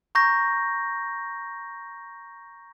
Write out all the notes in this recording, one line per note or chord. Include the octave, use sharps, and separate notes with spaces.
A#5 C#6 G6 A#6